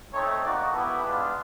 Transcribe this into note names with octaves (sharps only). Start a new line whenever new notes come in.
A3 C4 D#4 C#5
A#3 D#4 F#4 D5
B3 E4 G4 A4
G#3 B3 D4 F4 B4